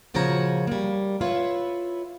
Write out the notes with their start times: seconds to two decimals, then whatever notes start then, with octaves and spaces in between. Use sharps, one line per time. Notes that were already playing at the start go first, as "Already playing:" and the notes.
0.14 A#2 C#3 F3 F#4 C#5 A#5
0.67 G3 A#3
1.21 E4 F4 B4 C#5 E5